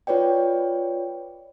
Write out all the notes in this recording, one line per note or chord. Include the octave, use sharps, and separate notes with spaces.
F4 B4 C#5 D5 G5